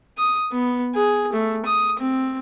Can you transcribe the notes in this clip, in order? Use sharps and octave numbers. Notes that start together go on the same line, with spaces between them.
D#6
B3
G#4
A3
D#6
C4